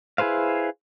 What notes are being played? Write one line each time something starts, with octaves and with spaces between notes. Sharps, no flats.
E4 G#4 B4 C5 F5